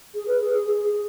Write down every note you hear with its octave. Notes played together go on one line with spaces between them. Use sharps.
G#4
B4
G#4
G#4
G#4
G#4